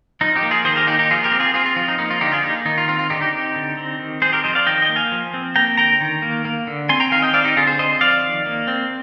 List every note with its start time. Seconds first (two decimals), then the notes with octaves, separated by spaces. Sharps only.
0.21 F3 D#4
0.35 D#4 G4
0.43 A#3
0.51 F4 G#4
0.64 D#3 G#4 C5
0.76 G4 A#4
0.87 A#3 D#4 G4
0.99 D#4 G4
1.10 F3 F4 G#4
1.24 G4 A#4
1.32 C4
1.40 F4 G#4
1.54 C4 F4 G#4
1.66 F4
1.76 F3 F4
1.88 D#4
1.98 A#3 D#4
2.10 F4
2.21 D3 D#4 G4
2.32 F4 G#4
2.43 A#3 D#4 G4
2.65 D#3 D#4
2.78 F4
2.88 C4 F4
2.99 F4
3.10 D3 D#4 G4
3.21 D#4 G4
3.32 C4
3.55 D3
3.77 C4
3.99 D#3
4.22 C4 G#4 C5
4.32 G4 A#4
4.44 F3 C5 D#5
4.55 D5 F5
4.66 D#3 D#5 G5
4.82 D#5 G5
4.89 A#3
4.96 F5 G#5
5.12 F3
5.34 C4
5.56 A#3 G5 A#5
5.77 D3 G5 A#5
6.01 D#3
6.22 A#3
6.45 A#3
6.67 D3
6.89 C4 G#5 C6
7.00 G5 A#5
7.11 D#3 F5 G#5
7.22 D#5 G5
7.34 C4 D5 F5
7.44 D#4 G4
7.57 D3 F4 G#4
7.67 G#4 C5
7.78 C4 C5 D#5
8.00 F3 D5 F5
8.23 D#3
8.46 A#3
8.67 C4